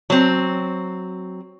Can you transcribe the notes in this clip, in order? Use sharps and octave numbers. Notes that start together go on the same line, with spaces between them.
F#3 C4